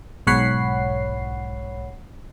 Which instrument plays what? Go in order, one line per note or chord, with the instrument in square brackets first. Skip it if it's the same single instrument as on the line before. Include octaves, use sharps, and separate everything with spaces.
[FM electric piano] B1 G#2 C#5 F#5 B5 C7